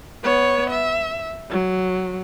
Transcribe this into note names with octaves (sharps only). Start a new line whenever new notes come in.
B3 C#5
E5
F#3